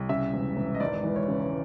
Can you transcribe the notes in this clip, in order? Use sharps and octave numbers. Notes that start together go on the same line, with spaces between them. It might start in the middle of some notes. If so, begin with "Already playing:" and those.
Already playing: C2
C#3 E5
E1
E1
D#5
G#1 D5
E3
C#5
C#3